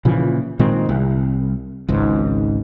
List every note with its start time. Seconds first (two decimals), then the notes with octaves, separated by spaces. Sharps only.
0.05 A#2 C#3 E3 F3
0.59 A#2 D#3 G#3 C4
0.89 C2
1.88 G#1 C#2 G#2